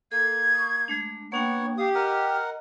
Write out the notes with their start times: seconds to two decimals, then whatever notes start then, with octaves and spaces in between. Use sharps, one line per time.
0.12 A#3 A4 G#6
0.54 C#6 D#6
0.88 G#3 A3 D4
1.32 A#3 B3 D4 C#5 F#5 G5
1.78 G4 F5 D#6
1.95 A#4 D#5 F#5 F6